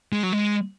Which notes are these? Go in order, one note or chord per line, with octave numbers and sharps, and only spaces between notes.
G#3
F#3
G#3